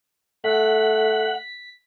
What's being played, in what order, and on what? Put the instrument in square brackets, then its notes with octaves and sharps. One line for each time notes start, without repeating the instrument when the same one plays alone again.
[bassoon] A3 [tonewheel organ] F#5 [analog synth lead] B6